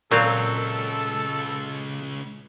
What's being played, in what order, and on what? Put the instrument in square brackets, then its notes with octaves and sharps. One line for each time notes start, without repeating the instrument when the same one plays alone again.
[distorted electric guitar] C#2 [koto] A#2 [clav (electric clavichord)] F#3 C4 F5 [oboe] A4